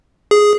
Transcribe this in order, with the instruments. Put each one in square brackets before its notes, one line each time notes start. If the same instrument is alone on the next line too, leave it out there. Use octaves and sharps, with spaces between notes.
[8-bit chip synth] G#4